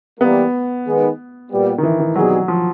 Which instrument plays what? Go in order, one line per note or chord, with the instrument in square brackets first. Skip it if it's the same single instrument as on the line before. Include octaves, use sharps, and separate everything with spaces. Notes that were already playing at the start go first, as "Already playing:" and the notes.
[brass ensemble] E3 G3 A#3 [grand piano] B3
[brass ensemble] D#3 G#3 B3
A#2 G3 B3
[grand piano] D#3
E3
D#3
[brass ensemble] B2 G3 C4 D#4 G#4 [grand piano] F#3
[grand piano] F3